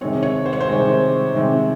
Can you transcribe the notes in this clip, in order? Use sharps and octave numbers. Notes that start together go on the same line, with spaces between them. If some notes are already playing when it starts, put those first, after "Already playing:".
C3 D#3 G#3 C4 C#5
C#5
C5
C#5
C5
C3 D#3 G#3 C4
C3 D#3 G#3 C4